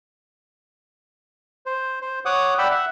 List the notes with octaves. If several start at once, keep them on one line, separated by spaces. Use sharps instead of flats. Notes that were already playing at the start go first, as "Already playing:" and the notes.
C5
C5
C#5 F#5 D6 D#6
D5 F#5 G5 B5 E6
E5 F#5